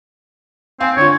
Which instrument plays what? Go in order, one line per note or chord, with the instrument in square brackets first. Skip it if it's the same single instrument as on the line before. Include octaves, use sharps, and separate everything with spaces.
[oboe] C4 [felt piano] F5 G#5
[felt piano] D3 F4 [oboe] C#5